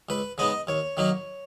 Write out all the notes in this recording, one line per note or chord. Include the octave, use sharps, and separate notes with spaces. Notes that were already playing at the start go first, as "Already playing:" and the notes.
C#2 B4
C#3 G#3 B3 D#4 D#5
D#2 C#5
D#3 F#3 A#3 D#4